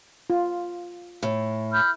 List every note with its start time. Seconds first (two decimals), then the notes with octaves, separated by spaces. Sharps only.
0.30 F4
1.23 A2
1.73 B5 F6 G6